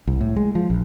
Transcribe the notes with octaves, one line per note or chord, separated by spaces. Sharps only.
C2
A2
G#3
F3
A#1